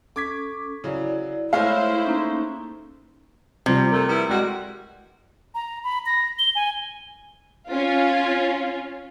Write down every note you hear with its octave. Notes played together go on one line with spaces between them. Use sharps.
C#4 A4 D6 G#6 B6
C#3 F#3 E4 D5
G#3 A3 E4 C5 C#5 F5
A#3 C#4 D#4
C3 F3 G3 C4
A3 A#4
G3 B3 E4
G3 G#3 F#4
A#5
B5
A#6
G7
G#5
C#4 F4